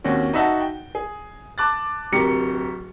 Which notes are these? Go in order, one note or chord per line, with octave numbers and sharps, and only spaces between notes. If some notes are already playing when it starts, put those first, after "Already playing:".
D#2 C4 C#4 F#4
D#4 F#4 E5 F#5 A5
G5
G#4
A5 D6 F#6 A6
D1 C3 G4 A#4 C#7